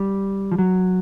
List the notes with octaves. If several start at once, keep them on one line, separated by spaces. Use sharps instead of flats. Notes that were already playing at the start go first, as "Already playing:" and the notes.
Already playing: G3
F3
F#3